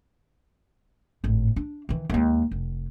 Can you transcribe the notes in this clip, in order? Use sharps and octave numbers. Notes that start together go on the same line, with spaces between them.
G#1 A2
D4
D#3 E3
D#2 G#3
F1